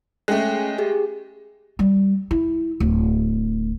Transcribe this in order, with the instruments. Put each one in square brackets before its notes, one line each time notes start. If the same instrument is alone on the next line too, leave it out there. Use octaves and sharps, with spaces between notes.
[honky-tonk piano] G#3 A3 [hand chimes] C#4 G5 F#6
[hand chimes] G4 G#4
[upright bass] G3
E4
D1